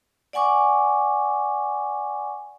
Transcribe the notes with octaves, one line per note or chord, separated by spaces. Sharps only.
D5 F#5 G#5 C#6 D6